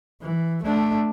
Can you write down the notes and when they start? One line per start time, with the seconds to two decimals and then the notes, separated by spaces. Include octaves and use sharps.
0.22 E3
0.63 A3 D4